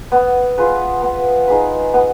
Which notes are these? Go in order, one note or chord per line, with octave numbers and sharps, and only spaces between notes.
B3
F4 G#4 B4
B3
D#4 G#4 B4
B3